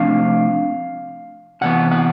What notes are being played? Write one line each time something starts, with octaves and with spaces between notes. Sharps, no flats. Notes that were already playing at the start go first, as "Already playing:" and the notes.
Already playing: C3 F3 A3 D4 F5
C3 E3 B3 F#5
F#5